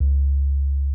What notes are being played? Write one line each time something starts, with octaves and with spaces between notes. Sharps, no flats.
C#2